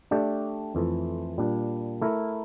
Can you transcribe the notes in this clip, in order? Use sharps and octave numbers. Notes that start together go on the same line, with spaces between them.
A3 D4 G4 D5
F2 E3 A3
A#2 G3 D4
A3 E4 A#4